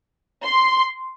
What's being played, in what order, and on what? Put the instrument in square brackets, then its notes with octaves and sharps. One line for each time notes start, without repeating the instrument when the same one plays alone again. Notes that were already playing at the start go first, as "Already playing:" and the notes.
[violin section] C6